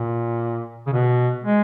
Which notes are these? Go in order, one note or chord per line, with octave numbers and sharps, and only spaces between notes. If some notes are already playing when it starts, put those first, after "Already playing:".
Already playing: A#2
C#3
B2
G#3